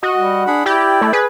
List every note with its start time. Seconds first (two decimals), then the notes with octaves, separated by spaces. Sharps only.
0.03 F#4 D#5
0.17 G3
0.47 D4 G#4 F#5 B5
0.66 E4 G4 D5 G5
1.01 A3
1.13 G#4 B4